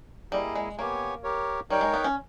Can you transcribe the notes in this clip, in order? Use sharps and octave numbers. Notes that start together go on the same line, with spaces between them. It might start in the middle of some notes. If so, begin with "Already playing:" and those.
G3 A#3 E4 G#4 D#5
G#3
A#3 B3 G4 C#5 G#5
G4 A#4 C#5
G3 D#4 A#4 C#5 G5
G#3
B3
C#4